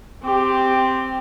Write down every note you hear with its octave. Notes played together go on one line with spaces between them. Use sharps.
C4 G4